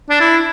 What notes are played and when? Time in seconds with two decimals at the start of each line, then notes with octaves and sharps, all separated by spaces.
0.10 D4
0.20 E4